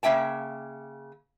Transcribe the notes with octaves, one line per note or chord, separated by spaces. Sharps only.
C#3 A#3 E5 G5 A5